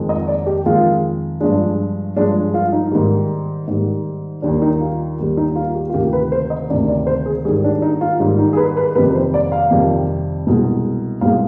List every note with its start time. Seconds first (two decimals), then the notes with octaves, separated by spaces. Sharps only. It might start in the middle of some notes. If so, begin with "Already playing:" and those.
Already playing: F2 D#3 G#3
0.09 D#5
0.28 D5
0.46 G4
0.66 F2 D#3 G#3 F4
1.40 G2 F3 G#3 D4
2.16 G2 F3 G#3 D4
2.54 F4
2.72 D#4
2.91 G#2 D#3 G3
3.67 G#2 D#3 G3
4.42 D#2 D#3 G3 D4
4.62 D#4
4.81 F4
5.19 D#2 D#3 G3
5.37 D#4
5.55 F4
5.75 G4
5.90 F4
5.93 D2 C3 D#3 G4
6.13 B4
6.32 C5
6.50 D#5
6.69 D2 C3 D#3 D5
6.88 D5
7.07 C5
7.26 G#4
7.45 G#2 D#3 G3 G#4
7.64 D4
7.82 D#4
8.01 F4
8.20 G#2 D#3 G3
8.38 D#4
8.53 G#4
8.57 B4
8.77 B4
8.95 F2 C3 D#3 G3 B4
9.15 C5
9.34 D5
9.52 F5
9.70 F2 C3 D#3 G3
10.46 C2 B2 G#3
11.21 C2 B2 G#3 F5